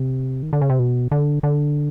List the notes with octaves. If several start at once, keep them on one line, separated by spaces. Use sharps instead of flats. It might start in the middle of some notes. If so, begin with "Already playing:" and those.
Already playing: C3
D#3
D3
C#3
C3
B2
D3
D3